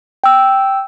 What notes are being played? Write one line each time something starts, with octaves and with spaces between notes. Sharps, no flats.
G5 E6